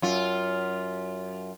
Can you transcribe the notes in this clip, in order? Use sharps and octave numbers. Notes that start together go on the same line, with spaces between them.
F#2 F4